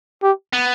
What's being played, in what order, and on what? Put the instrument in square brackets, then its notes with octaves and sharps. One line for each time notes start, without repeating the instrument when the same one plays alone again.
[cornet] G4
[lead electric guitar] B3